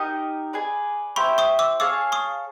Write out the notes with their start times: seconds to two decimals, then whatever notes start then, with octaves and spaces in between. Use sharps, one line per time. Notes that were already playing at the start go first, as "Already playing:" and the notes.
Already playing: D#4 G4 A#4 D#5
0.53 G#4 B4 D5
1.16 E4 G4 C5 B5 C#6
1.38 C#6 D#6
1.59 D6 E6
1.80 G#4 C#5 F5 A5 D6 E6
2.12 C#6 D#6